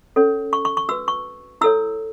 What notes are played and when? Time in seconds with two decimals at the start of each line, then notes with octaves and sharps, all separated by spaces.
0.16 C#4 A4 C#5
0.53 C#6
0.65 C#6
0.77 C#6
0.89 F#4 E6
0.91 B4
1.08 C#6
1.61 E4 A4 C#5 E6